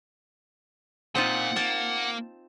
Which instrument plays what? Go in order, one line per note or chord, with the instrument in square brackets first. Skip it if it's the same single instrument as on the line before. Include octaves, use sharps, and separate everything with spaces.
[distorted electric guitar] A#2 [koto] C4 D#4 F4 [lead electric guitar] F#5
[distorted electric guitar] A#3 [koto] A5